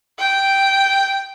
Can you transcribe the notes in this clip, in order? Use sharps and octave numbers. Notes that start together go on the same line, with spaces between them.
G5